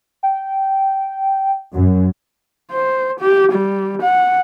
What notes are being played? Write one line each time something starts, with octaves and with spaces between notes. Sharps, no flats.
G5
F#2
C5
G4
G3
F#5